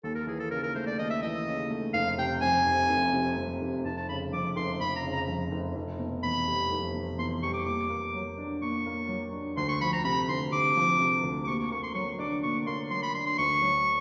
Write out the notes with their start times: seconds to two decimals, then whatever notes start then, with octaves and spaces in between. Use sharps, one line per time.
0.04 D#2 A4
0.15 A#4
0.27 E3 G#4
0.39 A4
0.51 C#3 A#4
0.63 A#4
0.75 A3 C5
0.86 D5
0.98 D#2 D#5
1.10 E5
1.22 E3 D#5
1.47 C#3
1.70 A3
1.94 F1 F5
2.17 C3 G5
2.41 F2 G#5
2.66 F1
2.89 F1
3.13 C3
3.37 F2
3.61 F1
3.85 F1 A5
3.97 A5
4.09 C#3 B5
4.33 F2 D6
4.56 F1 C6
4.80 F1 B5
4.96 A#5
5.03 C#3
5.12 A#5
5.28 F2
5.51 F1
5.75 F1
5.99 B2
6.23 E2 B5
6.48 G3
6.71 F1
6.94 B2
7.18 E2 C6
7.42 G3 C#6
7.54 D6
7.66 A#2 D6
7.89 A#3
8.14 F#3
8.38 D4
8.62 A#2 C#6
8.86 A#3
9.09 F#3
9.33 D4
9.57 D2 C6
9.69 C#6
9.81 F3 B5
9.93 A#5
10.04 C3 B5
10.29 D2 C6
10.52 D2 D6
10.76 F3
11.00 C3
11.23 D2
11.44 D6
11.47 A#2 C#6
11.59 C#6
11.71 A#3 C#6
11.83 C6
11.95 F#3 C#6
12.19 D4 D6
12.43 A#2 C#6
12.66 A#3 C6
12.91 F#3 C6
13.03 B5
13.15 D4 C6
13.26 C6
13.38 D2 C#6
13.62 F#3